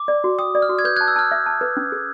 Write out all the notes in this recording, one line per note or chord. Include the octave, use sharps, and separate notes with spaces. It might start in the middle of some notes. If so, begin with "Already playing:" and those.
Already playing: D6
D5
F#4
G5 D#6
D5
F6
F#4
G#6
B4 G6
A5 F#6 G#6
E6
A5 F6
E5
A5
B4
C#4
G#4